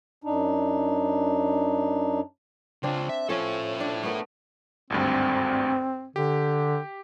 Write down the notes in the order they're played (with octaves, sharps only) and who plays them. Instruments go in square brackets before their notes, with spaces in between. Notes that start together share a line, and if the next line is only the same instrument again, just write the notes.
[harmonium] F#2 D4 D#4
[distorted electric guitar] C#3 F4 [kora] C4 D4
[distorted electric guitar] E5
[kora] F3 C#4 [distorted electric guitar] E4 A4
[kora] D4
A3 B3 A#4
[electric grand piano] G#1 D2 G2 [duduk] C4
[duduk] D3 [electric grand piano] G4